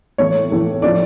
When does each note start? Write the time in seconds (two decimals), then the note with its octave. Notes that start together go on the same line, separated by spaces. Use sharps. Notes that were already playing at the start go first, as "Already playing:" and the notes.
0.18 A2 E3 A3 C#5
0.52 A2 E3 A3
0.82 A2 F3 A3 D5